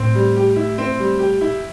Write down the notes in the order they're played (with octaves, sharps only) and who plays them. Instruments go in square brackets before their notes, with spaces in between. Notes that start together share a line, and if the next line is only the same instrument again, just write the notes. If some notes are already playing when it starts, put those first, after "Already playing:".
Already playing: [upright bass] A2 [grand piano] C4
[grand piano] G3
G4
E4
C4
G3
G4
E4